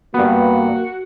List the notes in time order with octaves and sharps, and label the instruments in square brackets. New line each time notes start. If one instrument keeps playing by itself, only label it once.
[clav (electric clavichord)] G2 B3 [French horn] A#3 [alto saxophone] F#4